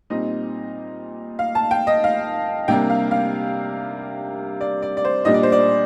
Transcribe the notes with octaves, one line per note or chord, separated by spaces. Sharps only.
A#2 G3 C4 D#4 D#5
F5
A5
G5
D#5
F5
C3 G3 A#3 D4 G5
F5
F5
D5
D5
D5
C5
A#2 G3 D4 D#5
D5
C5
D5